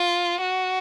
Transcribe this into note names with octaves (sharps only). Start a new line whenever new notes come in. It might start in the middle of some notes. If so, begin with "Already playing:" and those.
Already playing: F4
F#4